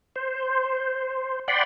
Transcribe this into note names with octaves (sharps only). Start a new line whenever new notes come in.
C5
D5 F#5 G5 B5 C6